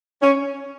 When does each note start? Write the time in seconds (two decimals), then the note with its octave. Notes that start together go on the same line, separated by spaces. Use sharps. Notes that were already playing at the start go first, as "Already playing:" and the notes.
0.21 C#4